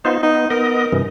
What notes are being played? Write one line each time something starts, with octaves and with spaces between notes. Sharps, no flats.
B3 D#4 F4 C5
B3 D#4
B3 A#4 D#5
G2 C3 E3